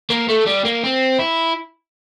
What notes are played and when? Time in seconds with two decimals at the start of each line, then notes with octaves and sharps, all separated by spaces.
0.10 A#3
0.28 A3
0.46 G3
0.65 A#3
0.84 C4
1.19 E4